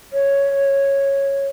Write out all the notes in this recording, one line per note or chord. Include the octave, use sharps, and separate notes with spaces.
C#5